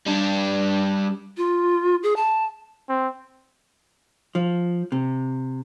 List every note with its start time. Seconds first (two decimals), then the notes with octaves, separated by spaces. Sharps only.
0.06 G3 D4
1.37 F4
2.03 G#4
2.16 A5
2.89 C4
4.35 F3
4.92 C3